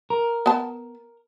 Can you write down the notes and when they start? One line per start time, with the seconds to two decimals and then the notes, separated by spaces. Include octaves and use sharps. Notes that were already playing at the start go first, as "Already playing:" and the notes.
0.10 A#4
0.46 B3 A5